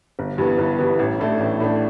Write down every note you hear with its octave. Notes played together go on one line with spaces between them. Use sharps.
G1
G2 E3 B3
G1
G2 E3 B3
A1
A2 A3 D4
A1
A2 A3 D4